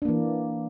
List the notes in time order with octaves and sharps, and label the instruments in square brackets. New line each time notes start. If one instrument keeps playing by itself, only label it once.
[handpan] D4
A#3
E3